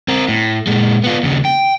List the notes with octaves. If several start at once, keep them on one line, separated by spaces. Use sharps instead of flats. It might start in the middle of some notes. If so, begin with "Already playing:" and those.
C4 A#4
A2
A#2 G#3
B3 F4
D#2 C#3
G5